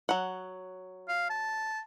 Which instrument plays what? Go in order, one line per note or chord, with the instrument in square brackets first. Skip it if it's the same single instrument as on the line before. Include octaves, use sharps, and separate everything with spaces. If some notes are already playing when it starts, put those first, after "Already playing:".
[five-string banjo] F#3 F#5
[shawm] F5
A5